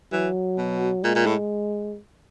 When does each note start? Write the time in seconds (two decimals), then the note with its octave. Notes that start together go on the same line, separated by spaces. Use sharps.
0.12 E3 F#3
0.58 B2
1.04 A#2 G#3
1.15 A#2
1.26 A2